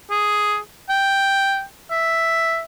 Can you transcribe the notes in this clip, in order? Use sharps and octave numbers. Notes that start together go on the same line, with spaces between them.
G#4
G5
E5